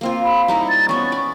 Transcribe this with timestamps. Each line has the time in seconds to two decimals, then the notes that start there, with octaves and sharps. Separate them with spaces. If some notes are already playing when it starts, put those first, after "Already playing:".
0.01 A#3 C4 F4
0.25 B5
0.48 G3 D#4 E4 A#5
0.69 A6
0.89 B3 C#4 C#6
1.12 D5